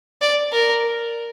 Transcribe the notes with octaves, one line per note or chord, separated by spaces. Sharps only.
D5
A#4